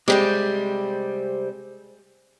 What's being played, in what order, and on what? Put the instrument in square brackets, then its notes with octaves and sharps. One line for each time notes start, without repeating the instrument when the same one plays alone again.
[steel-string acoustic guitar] C3 G3 C4 [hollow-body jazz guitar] G#3 G4